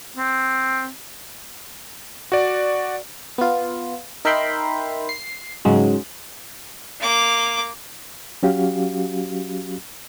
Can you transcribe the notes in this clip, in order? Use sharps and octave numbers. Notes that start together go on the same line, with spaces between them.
C4
F#4 D5
B3 F4
D#4 A#4 E5 G5 B5 C6
C7
G#2 C#3 F#3 G#3
A#3 D6
F#3 C#4 F#4 G4 F5